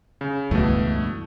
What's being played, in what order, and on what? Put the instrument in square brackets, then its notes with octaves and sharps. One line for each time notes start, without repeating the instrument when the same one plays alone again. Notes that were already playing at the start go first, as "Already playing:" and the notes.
[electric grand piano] C#3
[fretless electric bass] C#2 G2 E3 [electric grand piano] B2 A3